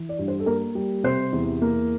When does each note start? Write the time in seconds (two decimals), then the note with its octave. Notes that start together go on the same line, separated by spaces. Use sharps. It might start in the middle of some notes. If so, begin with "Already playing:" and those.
Already playing: E3
0.09 D5
0.19 G2
0.28 C5
0.40 A4
0.46 A#3 A#4
0.75 G3
1.03 C3 C5
1.32 E2
1.62 A#3